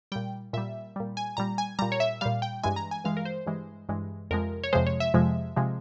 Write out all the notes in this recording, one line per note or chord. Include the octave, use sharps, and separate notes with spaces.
A#2 G3 G5
A#2 G3 E5
A#2 G3
G#5
A#2 G3 A#5
G#5
A#2 G3 A#5
C#5
E5
A#2 G3 F5
G5
G2 E3 G#3 G#5
A#5
G#5
G2 E3 G#3 F5
A#4
C5
G2 E3 G#3
G2 E3 G#3
F2 C3 F3 G#3 A#4
C#5
F2 C3 F3 G#3 C5
C#5
E5
F2 C3 F3 G#3
C3 F3 G#3